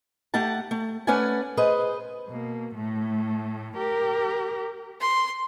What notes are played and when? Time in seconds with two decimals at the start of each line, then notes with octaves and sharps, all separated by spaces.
0.34 A3 G4 F#5 A5
0.71 A3
1.07 A3 C#4 B4 D5 F#5 G#5
1.57 G#4 B4 C5 D#5
2.28 B2 A#3
2.75 A2 A3
3.77 G4 A#4
5.01 C6